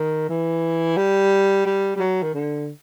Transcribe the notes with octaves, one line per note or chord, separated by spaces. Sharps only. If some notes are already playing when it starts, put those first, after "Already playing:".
Already playing: D#3
E3
G3
G3
G3
F#3
D#3
D3